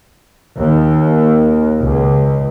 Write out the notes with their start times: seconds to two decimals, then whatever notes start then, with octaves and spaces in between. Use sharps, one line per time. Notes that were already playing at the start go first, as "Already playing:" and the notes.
0.59 D#2
1.80 C#2